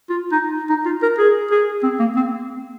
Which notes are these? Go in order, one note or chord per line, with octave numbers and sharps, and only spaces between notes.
F4
D#4
D#4
F4
A#4
G#4
G#4
C4
A#3
C4